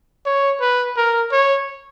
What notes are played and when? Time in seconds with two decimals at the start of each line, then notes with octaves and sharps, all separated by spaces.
0.26 C#5
0.60 B4
0.97 A#4
1.32 C#5